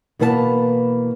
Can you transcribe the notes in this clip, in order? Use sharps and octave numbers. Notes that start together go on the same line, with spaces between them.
B2 E3 A#3 B4 D5 A5